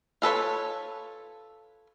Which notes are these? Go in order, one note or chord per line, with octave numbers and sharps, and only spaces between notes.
F4 A4 B4 C#5